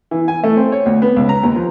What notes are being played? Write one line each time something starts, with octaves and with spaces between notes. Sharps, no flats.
E3
G#5
A3
C4
C#5
D2
B3
C#2
A#5
D#2
F3